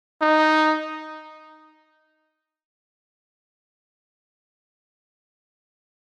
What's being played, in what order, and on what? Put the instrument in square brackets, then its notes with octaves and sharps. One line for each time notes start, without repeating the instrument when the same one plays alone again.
[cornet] D#4